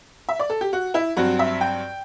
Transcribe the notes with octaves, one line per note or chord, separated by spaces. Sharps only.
E5
D5
A4
G4
F#4
E4
G2 F#3 C4 F#4
E5
G5